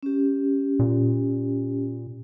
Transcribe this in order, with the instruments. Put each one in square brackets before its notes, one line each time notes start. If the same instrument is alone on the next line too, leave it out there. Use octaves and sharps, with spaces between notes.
[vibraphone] C#4 G4
[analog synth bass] A#2